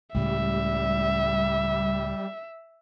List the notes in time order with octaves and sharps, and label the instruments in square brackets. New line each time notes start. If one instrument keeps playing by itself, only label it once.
[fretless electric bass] C#2 A2 C#3 [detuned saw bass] G3 [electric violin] E5